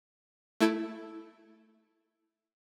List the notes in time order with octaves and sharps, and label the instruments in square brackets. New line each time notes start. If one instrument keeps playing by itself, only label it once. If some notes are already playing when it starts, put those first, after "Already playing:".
[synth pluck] A3 E4 A4 G#6 D7